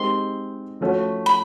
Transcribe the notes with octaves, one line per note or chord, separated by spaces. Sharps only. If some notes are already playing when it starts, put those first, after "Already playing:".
Already playing: G#3 C4 D#4 G4 A#4 C6
F3 A3 C#4 F#4
B5